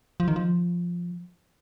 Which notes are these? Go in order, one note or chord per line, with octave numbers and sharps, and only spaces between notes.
F3
D#3
F3